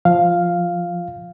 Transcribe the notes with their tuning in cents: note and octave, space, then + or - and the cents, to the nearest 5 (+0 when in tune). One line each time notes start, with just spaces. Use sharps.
F3 +0 F5 +0